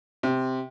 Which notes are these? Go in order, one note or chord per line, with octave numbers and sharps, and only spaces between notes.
C3